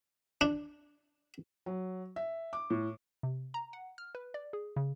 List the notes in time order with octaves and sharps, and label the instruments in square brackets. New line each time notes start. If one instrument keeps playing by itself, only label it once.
[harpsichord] D4
[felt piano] F#3
E5
D6
A2
[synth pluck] C3
A#5
F#5
F6
B4
D5
G#4
C#3